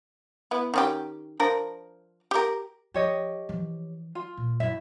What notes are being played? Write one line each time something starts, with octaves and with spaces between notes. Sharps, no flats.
B3 E4
D#3 C#4 G4
F3 D4 A#4
G4 A#4
F3 G4 C#5 D#5
E3 F3
F4
A#2
F#2 E4 E5